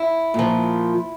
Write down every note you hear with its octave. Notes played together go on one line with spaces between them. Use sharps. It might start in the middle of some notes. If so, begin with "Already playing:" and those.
Already playing: E4
A#2 F3